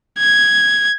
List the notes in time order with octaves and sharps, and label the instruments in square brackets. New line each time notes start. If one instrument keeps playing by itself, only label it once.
[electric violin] G#6